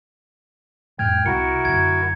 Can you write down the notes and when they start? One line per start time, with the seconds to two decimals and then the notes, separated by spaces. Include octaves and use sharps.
0.99 F2 A2 G#3 G5 F6 G#6
1.26 C2 C3 E4 F#4 A#4 C#7
1.65 B1 F#2 D3 G#6